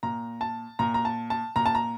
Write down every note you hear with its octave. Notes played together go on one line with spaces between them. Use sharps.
A#2 A#5
A5
A#2 A#5
A#5
A5
A5
A#2 A#5
A5
A#5